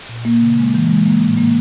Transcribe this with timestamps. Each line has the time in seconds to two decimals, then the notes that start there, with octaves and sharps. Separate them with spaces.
0.09 A#2
0.25 A#3
0.41 C#3
0.58 G#3
0.74 E3
0.89 G#3
1.06 A#3
1.21 A2
1.38 A#3